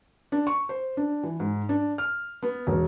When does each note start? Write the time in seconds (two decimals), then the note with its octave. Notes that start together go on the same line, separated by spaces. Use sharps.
0.32 D4
0.47 C#6
0.69 C5
0.97 D4
1.23 E3
1.40 G#2
1.69 D4
1.98 F6
2.43 B3
2.67 E1